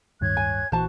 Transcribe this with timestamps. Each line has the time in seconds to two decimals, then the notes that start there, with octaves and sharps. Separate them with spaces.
0.21 D1 G2 D#3 C#5 F#6 G#6
0.37 G#5
0.72 A#1 A#2 E3 F#4 C5 A5